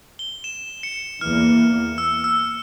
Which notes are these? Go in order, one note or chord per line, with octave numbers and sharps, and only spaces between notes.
G7
E7
C#7
E2 E3 A#3 F6
E6
E6